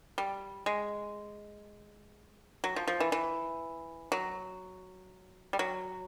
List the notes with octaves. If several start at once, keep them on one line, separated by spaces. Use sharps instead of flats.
G3
G#3
F#3
F3
F3
E3
E3
F#3
G3
F#3